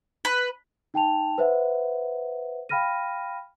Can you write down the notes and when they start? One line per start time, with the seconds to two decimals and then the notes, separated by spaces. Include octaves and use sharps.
0.25 B4
0.94 D#4 G5 A5 F7
1.38 B4 C5 E5 F#5
2.69 F5 G5 B5 F6 A#6 D#7